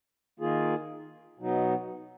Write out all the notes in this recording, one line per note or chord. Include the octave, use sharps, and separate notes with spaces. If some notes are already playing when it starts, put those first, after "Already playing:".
D#3 A#3 F4 G#4
B2 F#3 B3 D#4